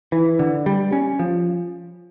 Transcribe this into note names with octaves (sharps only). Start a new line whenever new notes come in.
E3
D3
G3
C#4
F3